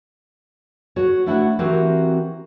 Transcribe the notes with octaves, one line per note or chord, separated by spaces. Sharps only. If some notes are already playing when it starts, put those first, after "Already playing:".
F#4 C#5
A3 D4 E4 F#4 F#5
E3 C4 F#4 G4 A#4